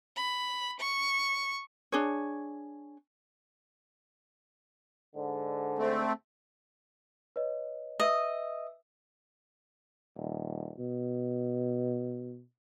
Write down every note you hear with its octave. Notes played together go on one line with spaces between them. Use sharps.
B5
C#6
D4 G#4 C#5
G#2 D3
A3 C4
B4 C#5 D#5
B4 D#5 E5 E6
D#1
B2